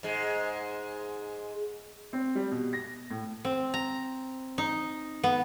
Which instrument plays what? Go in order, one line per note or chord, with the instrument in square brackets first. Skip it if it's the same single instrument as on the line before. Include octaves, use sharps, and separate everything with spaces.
[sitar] G#2 G#3
[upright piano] C4
G3
B2
A#6
A2
[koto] C4
A#5
D#4
B3